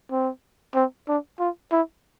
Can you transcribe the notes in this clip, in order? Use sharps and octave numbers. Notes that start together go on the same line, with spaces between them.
C4
C4
D4
F4
E4